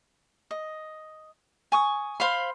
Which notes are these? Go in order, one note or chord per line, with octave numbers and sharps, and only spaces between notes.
D#5
G#5 C#6 D#6
C5 F5 B5 C6